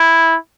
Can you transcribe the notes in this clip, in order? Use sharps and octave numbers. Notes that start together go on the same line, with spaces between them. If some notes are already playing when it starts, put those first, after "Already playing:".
Already playing: E4